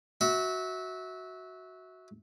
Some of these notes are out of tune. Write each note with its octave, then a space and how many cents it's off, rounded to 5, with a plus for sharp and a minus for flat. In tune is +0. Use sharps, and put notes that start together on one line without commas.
F#4 +0 E5 -25